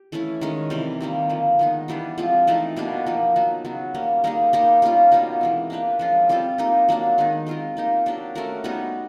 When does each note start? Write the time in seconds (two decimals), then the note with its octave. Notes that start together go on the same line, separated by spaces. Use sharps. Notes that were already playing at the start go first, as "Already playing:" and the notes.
Already playing: G4
0.12 E3 A3 C#4 E4
0.41 D#3 G#3 C#4
0.70 C3 E3 G3
1.01 C3 D#3 G3 A#3
1.29 D3 F3 A#3
1.59 D#3 G#3 B3 D#4
1.88 E3 G3 B3 D4
2.18 F3 G#3 C4 F4
2.47 E3 A3 C4 D#4
2.76 B2 G3 A#3 D4
3.06 F3 A#3 D#4
3.36 F#3 B3 D#4
3.65 C#3 F#3 B3
3.95 G3 A#3 C#4
4.24 G3 A#3 D#4 G#4
4.53 G3 A#3 D#4 G4
4.82 G3 A#3 C#4 F4
5.12 B2 G3 A#3 D#4
5.41 E3 G#3 C4
5.70 A#3 D4 G4 B4
5.99 F3 G#3 C#4 F4
6.29 G3 C4 F4 A4
6.58 A#3 D#4 G4
6.89 F#3 A#3 D4
7.18 D#3 G#3 B3 D#4
7.47 G#3 C4 F4 A#4
7.77 A#3 D#4 G4
8.06 F#3 A#3 D4 G4
8.35 A3 C#4 F#4 A#4
8.64 G3 B3 D#4 F#4